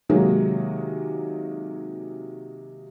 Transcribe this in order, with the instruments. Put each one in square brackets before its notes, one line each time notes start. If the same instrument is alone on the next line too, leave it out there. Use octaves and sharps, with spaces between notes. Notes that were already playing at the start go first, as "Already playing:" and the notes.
[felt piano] C3 D#3 F#3 G#3 A#3